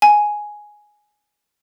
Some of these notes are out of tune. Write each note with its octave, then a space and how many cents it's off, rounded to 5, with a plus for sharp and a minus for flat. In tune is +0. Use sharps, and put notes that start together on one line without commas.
G#5 +5